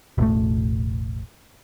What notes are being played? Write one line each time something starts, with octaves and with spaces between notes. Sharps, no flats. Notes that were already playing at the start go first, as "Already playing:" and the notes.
E1 A1 A3